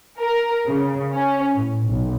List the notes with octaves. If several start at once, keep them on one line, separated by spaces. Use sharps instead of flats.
A#4
C#3
C#4
A2
B1